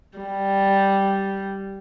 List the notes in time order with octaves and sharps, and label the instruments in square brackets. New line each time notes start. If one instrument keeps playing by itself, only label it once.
[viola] G3